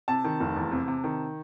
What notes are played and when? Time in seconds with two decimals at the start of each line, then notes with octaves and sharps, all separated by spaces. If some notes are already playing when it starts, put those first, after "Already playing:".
0.08 C3 A5
0.24 D#3
0.40 F1
0.56 E2
0.72 C3
0.88 C3
1.04 D#3